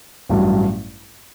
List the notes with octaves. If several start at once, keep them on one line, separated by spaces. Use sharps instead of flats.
A1 G2 F#3